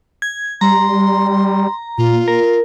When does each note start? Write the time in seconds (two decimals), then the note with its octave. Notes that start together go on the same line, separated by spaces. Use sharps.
0.22 G#6
0.61 G3 A#5 C6
1.98 A#2 F4
2.28 A#4